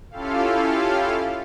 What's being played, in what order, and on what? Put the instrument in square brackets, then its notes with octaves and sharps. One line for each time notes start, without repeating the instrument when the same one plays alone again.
[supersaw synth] C#4 E4 F4 G4 A4 F5